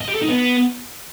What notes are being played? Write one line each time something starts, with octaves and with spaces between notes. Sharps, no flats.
D#5
G4
A4
D#4
B3